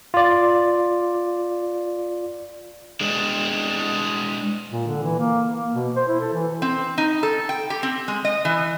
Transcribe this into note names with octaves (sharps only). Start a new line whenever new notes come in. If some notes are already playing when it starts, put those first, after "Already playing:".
F4 D5
G#3 D4
A#2
D3
E3
A#3
A#3
B2
C5
E4
A4
E3
C4
D#4
A4
G5
G4
C4
G#3
D#5
E3